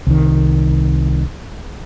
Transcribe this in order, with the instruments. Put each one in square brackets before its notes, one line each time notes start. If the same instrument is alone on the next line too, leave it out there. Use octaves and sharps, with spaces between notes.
[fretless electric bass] C2 D#3